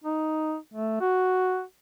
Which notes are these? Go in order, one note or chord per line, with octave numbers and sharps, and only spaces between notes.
D#4
A3
F#4